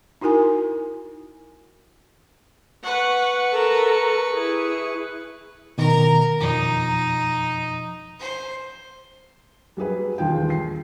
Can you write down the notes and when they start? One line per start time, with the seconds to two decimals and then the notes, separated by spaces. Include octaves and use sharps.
0.21 D#4 E4 F#4 A#4 G#5
2.84 B4 F#5 C#6
3.51 A4 A#4
4.32 E4 G#4
5.78 B2 D#3 A#4 A#5
6.40 F2 B2 F3 D#4
8.19 C5
9.77 F#3 G3 G#4 B4
10.18 E1 D#2 F4 G#4 G5
10.50 C7